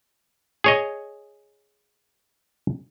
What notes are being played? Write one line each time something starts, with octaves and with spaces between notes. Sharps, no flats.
G#4 C#5 D#5